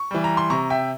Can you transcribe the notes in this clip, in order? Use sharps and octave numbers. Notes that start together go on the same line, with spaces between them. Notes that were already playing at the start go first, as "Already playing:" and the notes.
Already playing: C#6
E3 G3
A#5
C6
C3 A#5 C#6
E5 G5